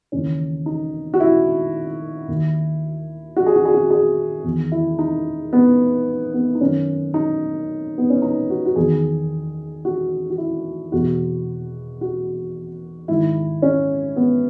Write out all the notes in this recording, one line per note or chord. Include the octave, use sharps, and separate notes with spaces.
D#2 C#3 E3 C#4
D#4
F#4
E4
D#2 D#3
F#4
G#4
F#4
G#4
F#4
G#4
E2
D#3
E4
D#4
B3
B3
D#4
F#2 D#3 C#4
D#4
B3
C#4
D#4
F#4
F#4
E2 D#3 G#4
F#4
F#4
E4
E2 B2 F#4
F#4
G#2 D#3 E4
C#4
B3